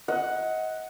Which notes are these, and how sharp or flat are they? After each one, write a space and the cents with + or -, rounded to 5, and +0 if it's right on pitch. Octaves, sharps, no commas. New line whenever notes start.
D#5 +30 F#5 +0